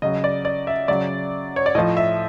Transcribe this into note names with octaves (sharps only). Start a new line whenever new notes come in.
C#3 F#3 D#5
D5
D5
E5
C#3 F#3 D5
C#5
D5
A2 F3 D#5
E5